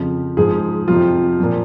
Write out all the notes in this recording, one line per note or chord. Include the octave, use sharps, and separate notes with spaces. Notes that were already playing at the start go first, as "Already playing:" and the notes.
Already playing: F2 C#3 F3
G#2 F3 G#4
F2 C3 F3 F4
A#2 F3